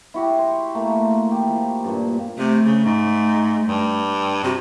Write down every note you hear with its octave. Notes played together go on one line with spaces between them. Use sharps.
E4 F#4 G4
C6
A3 A#3
G4
F3
G2 A#2
C3 A3
C#3
G#2
G2
C3 F#4